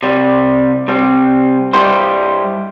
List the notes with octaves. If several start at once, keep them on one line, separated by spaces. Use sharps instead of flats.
C2 C3 G3
C3 G3 C4
G2 G3 E4 G4 C5